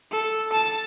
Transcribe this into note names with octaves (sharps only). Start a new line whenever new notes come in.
A4
A5